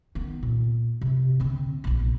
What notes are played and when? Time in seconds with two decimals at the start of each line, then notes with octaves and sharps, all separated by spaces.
0.15 D#3 B3
0.43 A#2
1.01 C3
1.40 D3 C4
1.84 A#1 B2